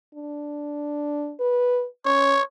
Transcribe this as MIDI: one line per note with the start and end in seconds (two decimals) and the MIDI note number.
0.14 1.33 62
1.40 1.85 71
2.05 2.36 61
2.05 2.42 73